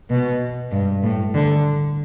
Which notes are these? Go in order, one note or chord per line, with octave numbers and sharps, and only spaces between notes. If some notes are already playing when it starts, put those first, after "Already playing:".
B2
G2
A2
D3